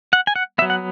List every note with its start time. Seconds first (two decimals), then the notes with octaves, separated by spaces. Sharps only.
0.13 F#5
0.27 G#5
0.36 F#5
0.58 B3 E5
0.62 F#3
0.70 F#5